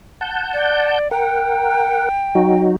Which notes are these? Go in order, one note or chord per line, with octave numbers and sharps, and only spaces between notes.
F#5 A5 G6
D5
A#4 F#5 G5
F#3 D#4 F#4